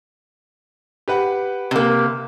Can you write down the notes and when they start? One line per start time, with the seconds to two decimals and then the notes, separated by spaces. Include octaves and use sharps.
1.08 G4 B4 F#5
1.71 C3 A#3